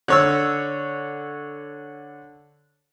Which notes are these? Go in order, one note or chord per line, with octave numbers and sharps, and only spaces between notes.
D3 C#5 E6